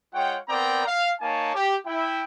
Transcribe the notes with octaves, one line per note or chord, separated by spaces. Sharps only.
G#3 F4 C#5 F#5 G5
B3 C4 A#4 D5 G5 A#5
F5
A#3 D#4 C#5 G#5 A5
G4
E4 G5